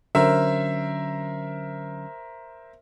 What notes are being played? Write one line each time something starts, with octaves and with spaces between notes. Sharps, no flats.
D3 F#3 C#4 A#4 C5 E5